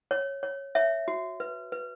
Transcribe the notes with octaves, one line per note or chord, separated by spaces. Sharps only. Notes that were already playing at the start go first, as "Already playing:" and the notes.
C#5
C#5
C#5 E5
F#4
B4
B4